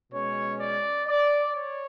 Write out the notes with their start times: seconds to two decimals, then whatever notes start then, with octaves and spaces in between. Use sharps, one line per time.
0.12 B2 G#3 C#4 C#5
0.60 D5
1.07 D5
1.54 C#5